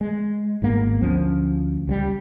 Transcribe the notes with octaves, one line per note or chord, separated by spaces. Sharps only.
G#3
G#1 G#2 A#3 B3
D2 F3 G#3 C#4
C#2 F#3 G3